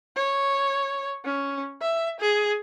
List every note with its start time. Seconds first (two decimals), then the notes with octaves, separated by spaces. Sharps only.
0.16 C#5
1.25 C#4
1.81 E5
2.20 G#4